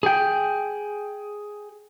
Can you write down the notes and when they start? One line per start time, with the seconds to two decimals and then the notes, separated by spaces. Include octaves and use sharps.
0.03 G#4 G5